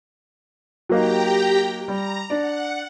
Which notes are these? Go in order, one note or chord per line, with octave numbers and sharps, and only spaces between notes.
F#3 A#3 D#4 G4 G5 A#5
G3 A#5
D4 D5 F#5